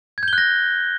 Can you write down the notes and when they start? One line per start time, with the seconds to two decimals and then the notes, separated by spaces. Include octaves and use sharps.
0.18 G#6
0.23 G6
0.28 G7
0.33 F#6
0.38 A#6